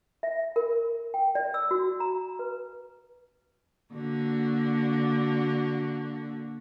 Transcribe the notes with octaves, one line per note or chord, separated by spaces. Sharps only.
E5
A#4
G5
D5
E6
F#4
A#5
B4
D3 A#3 F#4